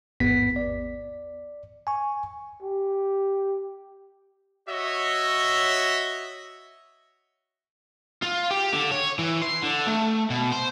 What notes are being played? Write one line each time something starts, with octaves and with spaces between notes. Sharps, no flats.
A1 E2 G#2 B3 B4 B6
D5
G#5 C#6
G4
F#4 C#5 D#5 E5
F4
G4
D3
C#5
E3
C6
D3
A3
B2
C5